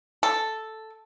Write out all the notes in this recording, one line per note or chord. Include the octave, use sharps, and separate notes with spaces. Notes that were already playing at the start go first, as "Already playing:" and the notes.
A4